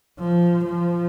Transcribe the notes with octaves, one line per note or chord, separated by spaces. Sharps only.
F3
F3